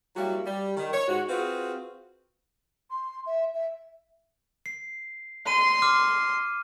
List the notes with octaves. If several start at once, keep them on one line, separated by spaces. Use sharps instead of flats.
F#3 G3 A#3 E4 F#4
G3
D#3
C#5
G#2 F#4
C4 F4 F#4 G#4 B4
C6
E5
E5
C7
C6 D#7
D6 F6